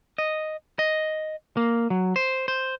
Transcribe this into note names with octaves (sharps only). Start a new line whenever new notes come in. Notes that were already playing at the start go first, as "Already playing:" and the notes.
D#5
D#5
A#3
F#3
C5
C5